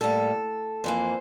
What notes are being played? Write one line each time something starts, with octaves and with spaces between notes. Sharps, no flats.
A2 G3 A#3 A4
F2 E3 A#3 C5